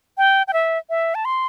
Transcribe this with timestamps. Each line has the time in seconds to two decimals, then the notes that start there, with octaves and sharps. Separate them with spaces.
0.18 G5
0.48 G5
0.53 E5
0.90 E5
1.15 A5
1.25 C6